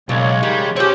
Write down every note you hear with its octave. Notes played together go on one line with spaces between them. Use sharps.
B1 A#2 C#3 G#3 C#5
D#3 G3
F3 C4 C#4 G4 G#4 C#5